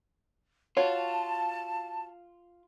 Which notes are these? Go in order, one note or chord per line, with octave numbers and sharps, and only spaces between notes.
F4 F#4 C#5 A5